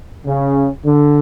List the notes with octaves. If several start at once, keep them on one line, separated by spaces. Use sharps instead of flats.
C#3
D3